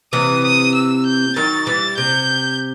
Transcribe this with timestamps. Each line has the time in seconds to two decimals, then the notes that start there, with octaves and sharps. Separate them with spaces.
0.13 C3 E3 D#6
0.44 D#6
0.74 E6
1.06 G6
1.36 D#3 F#3 A6
1.67 E3 G3 A6
1.97 C3 G6